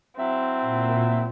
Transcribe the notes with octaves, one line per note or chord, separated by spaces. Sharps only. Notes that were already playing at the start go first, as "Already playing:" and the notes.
F#3 C4 E4 E5
A#2